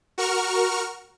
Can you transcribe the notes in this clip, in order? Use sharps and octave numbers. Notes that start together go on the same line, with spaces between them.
F#4 A#4 C#6 F6